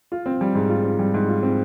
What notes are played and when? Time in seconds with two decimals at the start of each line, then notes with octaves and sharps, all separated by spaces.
0.12 F4
0.26 C4
0.41 G3
0.55 G#2
0.70 F4
0.84 C4
0.99 G3
1.14 G#2
1.28 F4
1.43 C4